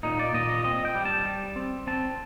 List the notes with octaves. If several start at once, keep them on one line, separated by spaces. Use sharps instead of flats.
A#2 D#4
D5
A#2 D#5
D#5
C4 D#5
G5
G3
A5
G3
C4
C4 A5